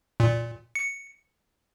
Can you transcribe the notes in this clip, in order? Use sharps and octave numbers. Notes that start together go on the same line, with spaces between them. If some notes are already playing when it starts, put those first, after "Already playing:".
A#2
C#7